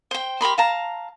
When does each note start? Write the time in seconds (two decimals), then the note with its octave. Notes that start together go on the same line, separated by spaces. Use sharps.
0.11 C5 G5
0.41 G4 A#4 B5 C6
0.58 F5 A5 A#5